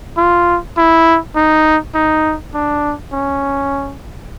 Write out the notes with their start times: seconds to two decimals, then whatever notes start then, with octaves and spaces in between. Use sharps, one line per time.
0.17 F4
0.77 E4
1.36 D#4
1.94 D#4
2.54 D4
3.13 C#4